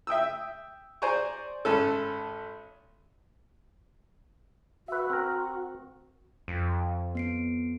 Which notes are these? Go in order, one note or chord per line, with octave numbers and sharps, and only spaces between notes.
E5 G5 D#6 E6
C5 D5 G#5 A#5 C#6
G#1 C#4 A4
F#4 B4 E5
C4 A#4
F2
B3 C7 D7